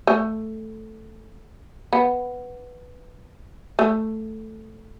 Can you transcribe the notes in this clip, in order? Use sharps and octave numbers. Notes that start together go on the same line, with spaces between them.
A3
B3
A3